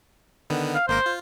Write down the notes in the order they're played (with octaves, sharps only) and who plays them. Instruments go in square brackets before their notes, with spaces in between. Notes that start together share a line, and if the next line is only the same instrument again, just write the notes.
[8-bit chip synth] D3 D#3 B3
[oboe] F5
[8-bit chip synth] G#1 A#3 A#4 [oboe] C5
[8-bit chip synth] F4